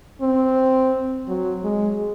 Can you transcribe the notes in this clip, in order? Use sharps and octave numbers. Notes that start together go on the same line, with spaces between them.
C4
F#3
G#3